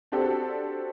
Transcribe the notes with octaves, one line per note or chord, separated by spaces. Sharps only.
C4 D4 F#4 G4 A4